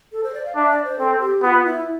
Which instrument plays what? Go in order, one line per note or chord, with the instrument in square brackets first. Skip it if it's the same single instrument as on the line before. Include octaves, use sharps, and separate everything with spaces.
[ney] A4
C5
D5
F5
[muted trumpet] D4 [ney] E5
[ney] D5
C5
[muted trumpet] C4 [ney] A4
[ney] G4
[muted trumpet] B3 [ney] F4
[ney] E4